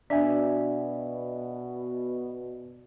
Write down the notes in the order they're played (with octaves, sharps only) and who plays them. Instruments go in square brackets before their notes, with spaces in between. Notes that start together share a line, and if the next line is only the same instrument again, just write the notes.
[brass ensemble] B2 [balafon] D4 [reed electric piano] D5 E5 G#5